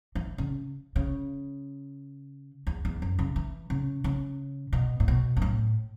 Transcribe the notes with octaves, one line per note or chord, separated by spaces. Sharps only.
E3
C#3
C#3
E2
E2
F#2
C#3
E3
C#3
C#3
B2
A2
B2
F#2
A2